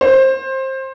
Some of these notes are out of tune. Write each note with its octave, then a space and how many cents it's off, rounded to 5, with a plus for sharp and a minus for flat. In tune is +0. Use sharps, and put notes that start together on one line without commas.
C5 +20